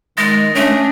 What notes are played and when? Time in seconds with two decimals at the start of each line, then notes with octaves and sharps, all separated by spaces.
0.18 D#3 G#3 D#6 A6 A#6
0.55 A3 C#4 D4